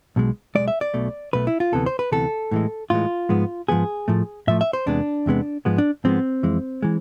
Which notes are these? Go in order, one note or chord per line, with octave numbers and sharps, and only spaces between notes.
B1 B2 G#3
B1 B2 G#3 D5
E5
D5
B1 B2 A3
B1 B2 A3 B4
E4
F4
D2 C3 E3 B3 A4
C5
B4
D2 C3 E3 B3 A4
A2 E3 G#3
A2 E3 G#3 F4
G#2 F3 G#3 B3
G#2 F3 G#3 B3 G#4
A2 F3 A3
A2 F3 A3 E5
E5
C5
E2 C3 G#3 B3 D4
E2 C3 G#3 B3
G#2 F3 G#3 B3
D4
G#2 F3 G#3 B3 C4
F2 E3 G#3
E3 G#3